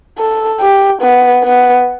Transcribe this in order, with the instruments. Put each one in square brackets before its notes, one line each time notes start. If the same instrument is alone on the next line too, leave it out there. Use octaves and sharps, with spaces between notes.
[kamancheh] A4
G4
B3
B3